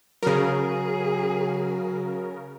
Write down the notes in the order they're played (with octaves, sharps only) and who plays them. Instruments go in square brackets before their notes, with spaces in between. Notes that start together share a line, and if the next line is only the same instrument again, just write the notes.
[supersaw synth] C#3 A#4 [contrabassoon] F#3 [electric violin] G#4